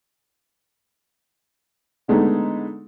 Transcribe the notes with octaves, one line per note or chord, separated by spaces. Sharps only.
D3 G#3 A3 B3 D#4